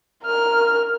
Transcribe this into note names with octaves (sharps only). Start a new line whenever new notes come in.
A#4 F6